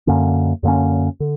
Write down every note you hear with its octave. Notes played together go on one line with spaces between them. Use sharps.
F#2 D3 A#3 C#4
F#2 D3 A#3 C#4
D3